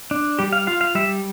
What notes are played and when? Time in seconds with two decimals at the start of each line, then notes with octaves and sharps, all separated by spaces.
0.11 D4
0.39 G3 G4
0.53 F5
0.67 F4 F5
0.81 F5
0.95 G3 E5